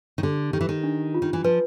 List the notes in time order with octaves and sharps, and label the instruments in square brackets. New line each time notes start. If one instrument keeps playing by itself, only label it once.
[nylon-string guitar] D#3
[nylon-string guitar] D3 [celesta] G4
[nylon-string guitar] D#3 [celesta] G4
[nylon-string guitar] E3
D#3
[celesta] D4
F4
[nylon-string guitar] D#3
E3
[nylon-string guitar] F3 [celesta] B4